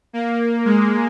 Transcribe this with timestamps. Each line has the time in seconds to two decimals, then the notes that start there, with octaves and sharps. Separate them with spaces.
0.13 A#3
0.65 G#3